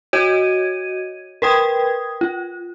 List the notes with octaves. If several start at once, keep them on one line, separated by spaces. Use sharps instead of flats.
F#4 C#5 D#5 G#6 D#7
A#4 B4 G5 D#6 G#6
F4